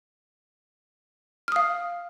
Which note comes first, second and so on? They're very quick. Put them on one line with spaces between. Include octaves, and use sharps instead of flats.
F6 D#6 F5